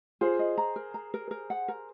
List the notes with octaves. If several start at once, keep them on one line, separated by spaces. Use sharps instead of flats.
F4 G#4 C5
D#5
A#5
A#4
A#5
A#4
A#4
F#5
A#4